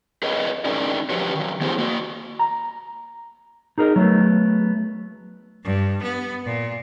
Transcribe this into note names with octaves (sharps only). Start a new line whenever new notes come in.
G#4 A#4 B4 C#5 D#5
C4 C#4 D#4 G#4 A#4 D5
F3 F#3 F#4 G4 B4 C#5
D#3 F#3
F3 B3 E4 G4 G#4 C5
A#3 F#4
A#5
D#4 G#4 A#4 D#5
F#3 A3 B3
G2
B3
A#2